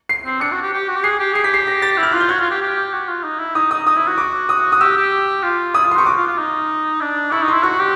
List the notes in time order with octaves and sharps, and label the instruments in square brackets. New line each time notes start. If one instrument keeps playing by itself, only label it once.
[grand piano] C7
[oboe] C4
[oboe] D4 [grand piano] C#7
[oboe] F#4
G4
G4
F#4
G4
[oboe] G#4 [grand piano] C7
[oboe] G4
[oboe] G#4 [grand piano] C7
[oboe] G4 [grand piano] B6
[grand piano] C7
A#6
A6
[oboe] E4
[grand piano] F6
[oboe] F4 [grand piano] F#6
[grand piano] G6
[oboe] F#4 [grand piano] G#6
[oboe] F4
G4
G4
F#4
F4
D#4
E4
[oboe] D#4 [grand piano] D#6
[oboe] D#4 [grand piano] D#6
[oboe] D#4 [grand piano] D#6
[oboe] E4
F#4
[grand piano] D6
D#6
D#6
[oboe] G4 [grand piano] E6
[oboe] G4
F4
[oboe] E4 [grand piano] D#6
[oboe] F4
[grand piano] C6
[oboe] G4 [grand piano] C#6
[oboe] F#4 [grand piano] D6
[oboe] F4
F4
D#4
D4
[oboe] E4 [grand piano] C#6
[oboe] D#4
[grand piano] C6
[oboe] E4
[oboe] F#4 [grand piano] C#6
[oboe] G4